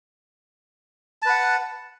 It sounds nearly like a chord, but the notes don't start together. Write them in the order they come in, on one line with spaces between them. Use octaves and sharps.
A5 B4 F#5